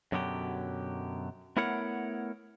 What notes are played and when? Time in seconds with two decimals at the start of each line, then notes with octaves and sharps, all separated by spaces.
0.12 F#2 B2 D3 F#3 G4
1.57 A3 B3 E4 A#4 C#5 F#5